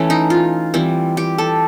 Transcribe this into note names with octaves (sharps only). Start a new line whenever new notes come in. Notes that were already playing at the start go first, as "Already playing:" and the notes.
Already playing: E3 A3 C#4
D#4
F4
E3 G3 C4
G4
A4